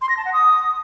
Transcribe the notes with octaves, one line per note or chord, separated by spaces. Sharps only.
C6
A#6
A5
F#5
D#6